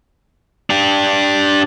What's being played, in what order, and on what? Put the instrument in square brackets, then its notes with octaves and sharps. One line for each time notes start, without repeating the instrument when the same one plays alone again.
[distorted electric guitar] D4 G4